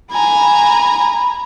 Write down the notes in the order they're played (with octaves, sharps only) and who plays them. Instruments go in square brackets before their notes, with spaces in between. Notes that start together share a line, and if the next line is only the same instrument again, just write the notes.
[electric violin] G#5 A#5 [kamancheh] B5